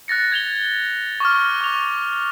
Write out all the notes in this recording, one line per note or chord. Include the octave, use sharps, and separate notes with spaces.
F#6 A6 A#6 C#7
G#6 F7 G7
C#6 D6 F6
C#6 F7